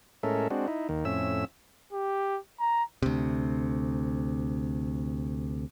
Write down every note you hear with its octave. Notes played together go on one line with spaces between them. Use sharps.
A2 G#3 C#4 A4 A#4 E5
G#3 C4 D4 F#4
D#4 E4
D#2 D#3
F2 A2 C#4 E5 E6
G4
A#5
D2 C3